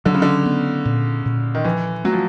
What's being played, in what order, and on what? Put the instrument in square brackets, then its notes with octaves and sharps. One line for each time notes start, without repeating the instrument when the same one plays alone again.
[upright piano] D3 [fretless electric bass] F#3
[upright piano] C#3
D3
[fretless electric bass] B3
A#2
A#2
[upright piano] D#3
[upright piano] E3 [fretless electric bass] F3
[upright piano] F#3 [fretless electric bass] A3
[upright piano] F3